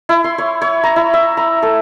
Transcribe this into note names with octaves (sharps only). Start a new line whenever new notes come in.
E4
C6
C#5
C#5
A#5
E4
E5
A#5
A4